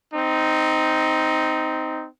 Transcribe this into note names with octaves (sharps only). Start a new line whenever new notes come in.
C4 D#4